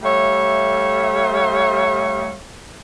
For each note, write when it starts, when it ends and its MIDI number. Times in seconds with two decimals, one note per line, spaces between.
0.03 2.36 55
0.03 2.36 57
0.03 2.36 73
0.03 2.36 76
0.03 2.36 77